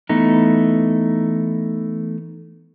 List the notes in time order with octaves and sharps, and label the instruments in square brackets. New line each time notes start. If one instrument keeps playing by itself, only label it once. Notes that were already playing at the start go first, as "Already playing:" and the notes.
[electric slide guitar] E3 A3 B3 D#4